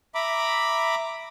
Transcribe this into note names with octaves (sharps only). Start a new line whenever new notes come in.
E5 A#5 B5 D6